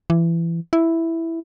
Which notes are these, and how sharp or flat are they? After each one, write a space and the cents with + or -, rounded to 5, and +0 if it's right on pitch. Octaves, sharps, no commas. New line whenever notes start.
E3 +25
E4 +0